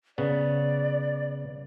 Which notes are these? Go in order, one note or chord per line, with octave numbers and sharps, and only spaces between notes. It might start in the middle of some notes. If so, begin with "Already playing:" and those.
C#3 B3 D5